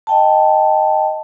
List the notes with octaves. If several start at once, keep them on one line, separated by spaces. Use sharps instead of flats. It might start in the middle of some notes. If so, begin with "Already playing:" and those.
D#5 G5 A5